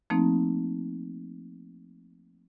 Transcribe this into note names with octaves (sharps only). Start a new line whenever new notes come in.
F3 A3 A#3 C4 D#4